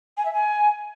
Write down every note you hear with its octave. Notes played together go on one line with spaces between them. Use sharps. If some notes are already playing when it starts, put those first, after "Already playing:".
G#5
E5
G#5